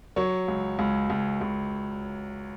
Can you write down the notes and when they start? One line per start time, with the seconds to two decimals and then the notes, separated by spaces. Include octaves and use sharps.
0.16 F#3 C#5
0.48 C#2
0.79 C#2
1.10 C#2
1.41 C#2